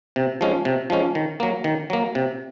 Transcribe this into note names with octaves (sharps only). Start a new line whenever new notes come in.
C3
F3 G#3 C#4
C3
F3 G#3 C#4
D#3
F#3 A#3
D#3
F#3 A#3
C3